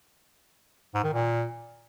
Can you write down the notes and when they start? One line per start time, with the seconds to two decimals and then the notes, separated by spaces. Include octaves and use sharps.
0.94 G#2
1.04 D#3
1.13 A#2